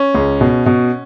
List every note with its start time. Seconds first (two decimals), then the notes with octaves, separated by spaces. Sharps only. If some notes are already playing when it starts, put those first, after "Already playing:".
Already playing: C#4
0.15 C#2
0.41 B2
0.66 B2